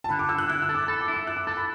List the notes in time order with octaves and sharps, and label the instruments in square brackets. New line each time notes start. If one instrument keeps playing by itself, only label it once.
[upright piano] A5
[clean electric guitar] D3 [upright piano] B5
[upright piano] D6
[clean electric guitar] D3 [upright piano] E6
[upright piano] F#6
[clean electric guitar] E4 [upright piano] F#6
[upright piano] E6
[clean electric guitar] A4
[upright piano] D6
[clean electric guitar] A4 [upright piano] B5
[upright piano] D6
[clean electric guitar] E4
[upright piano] E6
[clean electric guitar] E4 [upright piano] F#6
[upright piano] D6
[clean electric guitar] A4 [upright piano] D6
[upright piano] B5